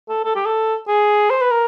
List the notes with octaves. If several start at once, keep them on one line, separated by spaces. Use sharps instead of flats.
A4
A4
G4
A4
G#4
C5
B4
A#4